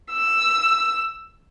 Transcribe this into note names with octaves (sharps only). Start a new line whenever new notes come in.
E6